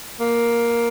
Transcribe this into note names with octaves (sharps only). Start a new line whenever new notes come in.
A#3